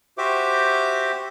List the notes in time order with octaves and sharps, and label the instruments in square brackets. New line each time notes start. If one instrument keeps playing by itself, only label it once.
[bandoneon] F#4 G4 C5 E5 D6